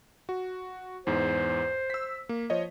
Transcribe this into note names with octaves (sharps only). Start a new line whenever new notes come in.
F#4
E2 G#2 C5
E6 B6
A#3
F3 C#5 D#5